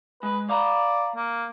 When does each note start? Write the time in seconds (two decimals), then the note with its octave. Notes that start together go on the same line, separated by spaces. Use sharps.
0.23 G#3 B4
0.49 D5 F5 A#5 B5
1.16 A#3